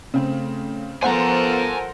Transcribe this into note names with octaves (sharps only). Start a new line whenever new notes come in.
C#3 A3 C4
F3 B3 A4 A#4 C5 F#5 G#5 A#5